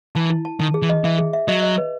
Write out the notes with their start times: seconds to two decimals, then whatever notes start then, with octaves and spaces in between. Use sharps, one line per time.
0.15 E3 A5
0.30 E4
0.45 A5
0.60 D#3 A5
0.74 G#4
0.82 E3
0.89 D#5
1.04 E3 E5
1.19 G#4
1.33 E5
1.48 F#3 D#5
1.62 D#5
1.78 B4